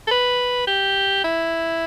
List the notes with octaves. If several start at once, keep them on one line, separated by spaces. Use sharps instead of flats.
A4
B4
G4
E4